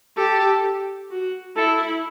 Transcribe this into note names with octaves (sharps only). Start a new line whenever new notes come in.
G4 A4
F#4
E4 A4